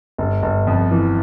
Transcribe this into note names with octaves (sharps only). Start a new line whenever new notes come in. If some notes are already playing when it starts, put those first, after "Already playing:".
G1
G1
F2
E3